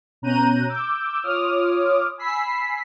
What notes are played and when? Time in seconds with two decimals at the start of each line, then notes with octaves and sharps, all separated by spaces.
0.22 B2 C#4 A#5 F#6 G6 D#7
0.68 D6 E6 G6
1.23 F4 C#5 D6 D#6 F6
2.18 G#5 B5 E6 B6 C7